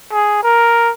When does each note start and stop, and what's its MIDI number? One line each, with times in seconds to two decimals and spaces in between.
0.13 0.42 68
0.43 0.91 70